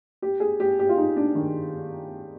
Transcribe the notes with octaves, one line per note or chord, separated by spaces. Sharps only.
G4
G#4
G4
G4
F4
D#4
D4
D#3